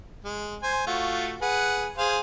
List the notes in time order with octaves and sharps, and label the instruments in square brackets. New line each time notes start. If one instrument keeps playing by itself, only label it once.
[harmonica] G#3
C5 G#5
A3 F4 F#4
G#4 B4 F#5
G#4 C5 F5